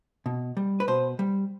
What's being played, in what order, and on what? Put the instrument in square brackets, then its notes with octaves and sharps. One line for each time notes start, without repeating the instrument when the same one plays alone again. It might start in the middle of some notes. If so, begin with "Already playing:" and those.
[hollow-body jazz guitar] B2
G3
B4
B2 C5
G3